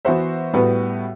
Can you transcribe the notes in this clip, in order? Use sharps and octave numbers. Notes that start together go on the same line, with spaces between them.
E3 B3 F#4 C5 E5
A2 G3 B3 F#4 B4